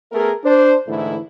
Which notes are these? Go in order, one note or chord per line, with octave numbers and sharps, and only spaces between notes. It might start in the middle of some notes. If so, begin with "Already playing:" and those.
A3 B3 G#4 A#4
D4 C5
G#2 D3 E3 A3 E4